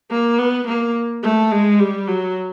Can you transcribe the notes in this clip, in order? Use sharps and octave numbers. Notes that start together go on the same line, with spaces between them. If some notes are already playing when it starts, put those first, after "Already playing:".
A#3
B3
A#3
A3
G#3
G3
F#3